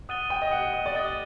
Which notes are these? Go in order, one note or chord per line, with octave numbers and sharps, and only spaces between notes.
F#5 D#6 F#6 A6 D#7 G7
G5
D#5
F#5
D#5
D5
D#5 D#6 F#6 A6 D#7 G7